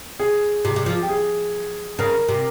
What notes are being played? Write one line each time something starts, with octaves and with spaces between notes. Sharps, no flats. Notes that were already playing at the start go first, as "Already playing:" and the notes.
G#4
C3
C3
F3
G4
G#4
C#3 A#4
C3